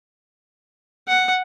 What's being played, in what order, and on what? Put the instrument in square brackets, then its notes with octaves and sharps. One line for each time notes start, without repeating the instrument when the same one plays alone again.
[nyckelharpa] F#5